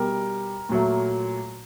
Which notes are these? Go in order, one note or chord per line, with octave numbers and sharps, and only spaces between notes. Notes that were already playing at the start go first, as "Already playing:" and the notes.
Already playing: B2 G3 A#4
A#2 F#3 A3